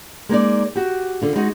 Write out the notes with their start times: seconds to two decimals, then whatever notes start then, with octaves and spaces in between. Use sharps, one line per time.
0.29 G#3 A#3 D#4 D5
0.75 F#4 G4
1.22 D3 F4
1.36 G#3 D#4 F#4